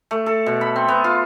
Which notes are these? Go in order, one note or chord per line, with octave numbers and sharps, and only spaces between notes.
A3
A4
B2
B5
C4
B3
F4